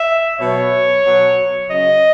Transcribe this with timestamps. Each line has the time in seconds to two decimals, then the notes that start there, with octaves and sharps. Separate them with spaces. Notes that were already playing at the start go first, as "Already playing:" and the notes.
Already playing: E5
0.40 B2 F#3 C#5
1.04 B2 F#3
1.67 C#3 F#3 D#5